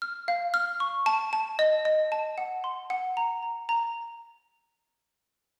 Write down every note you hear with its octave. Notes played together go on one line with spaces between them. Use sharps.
F6
F5
F6
C#6
A5
A5
D#5
D#5
A5
F#5
C6
F#5
A#5
A#5
A#5